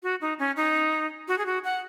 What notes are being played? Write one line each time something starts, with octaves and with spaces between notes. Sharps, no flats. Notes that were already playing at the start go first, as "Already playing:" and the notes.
F#4
D#4
C#4
D#4
F#4
G#4
F#4
F#5